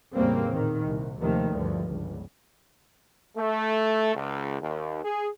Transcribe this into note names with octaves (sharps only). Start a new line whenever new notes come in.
A1 E2 C#3 G3 A#3 C4
A#2 D#3
C2
D#2 C3 D#3 F3 A3
D2 G2 F3
G1 C#2
A3
C#2
D#2
G#4